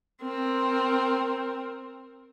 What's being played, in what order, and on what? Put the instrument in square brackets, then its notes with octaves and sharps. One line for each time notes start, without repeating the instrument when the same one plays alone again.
[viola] C4 A#4